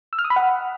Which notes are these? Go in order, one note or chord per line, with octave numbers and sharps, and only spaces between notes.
E6
F6
D#6
B5
F#5